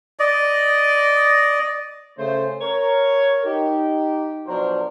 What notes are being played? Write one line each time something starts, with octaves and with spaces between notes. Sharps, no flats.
D5 D#5
C#3 A3 C5
A#4 C#5
D#4 G4
B2 F3 F#3 D4 A#4 C5